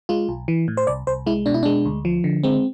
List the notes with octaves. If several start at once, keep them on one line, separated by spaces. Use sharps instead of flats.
G#3 F4
B1
E3
A2
C5
C2 D5
C2 C5
G#3 E4
B2 D4
E4
G#3 D4
D2
F3
D3
G#3 C4